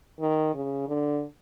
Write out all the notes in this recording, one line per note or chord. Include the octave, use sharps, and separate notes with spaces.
D#3
C#3
D3